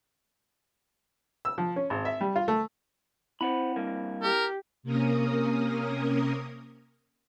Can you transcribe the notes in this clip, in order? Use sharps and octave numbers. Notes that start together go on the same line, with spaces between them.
E6
F3
C#4
G#1
E5
G3
F4
A3
C4 E4 C5 F#5 B5
G2 A#3
G4 A#4
C3 A#3 C#4 A#4 D#6